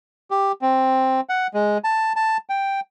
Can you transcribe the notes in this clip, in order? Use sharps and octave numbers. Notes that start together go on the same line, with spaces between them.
G4
C4
F#5
G#3
A5
A5
G5